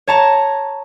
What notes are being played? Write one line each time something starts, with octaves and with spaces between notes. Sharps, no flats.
C#5 A5 A#5